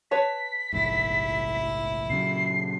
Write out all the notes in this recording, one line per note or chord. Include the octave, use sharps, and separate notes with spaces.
B4 C#5 A5 B6
F1 A#1 G#2 E4
A#2 C#3 F#3 C7